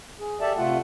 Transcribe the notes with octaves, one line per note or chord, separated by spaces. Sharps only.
G#4
G4 A4 D5 E5 A5
C3 A3 F4 F#5